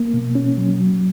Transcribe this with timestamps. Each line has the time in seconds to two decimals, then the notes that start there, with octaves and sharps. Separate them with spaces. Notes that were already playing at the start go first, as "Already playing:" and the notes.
Already playing: A#3
0.14 B2
0.35 C#4
0.57 F#3
0.79 F#3